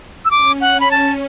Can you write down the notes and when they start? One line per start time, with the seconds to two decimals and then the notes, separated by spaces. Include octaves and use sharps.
0.25 E6
0.31 C#4 D6
0.61 F#5
0.80 B5
0.91 A5